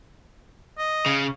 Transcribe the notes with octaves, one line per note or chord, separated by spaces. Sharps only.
D#5
C#3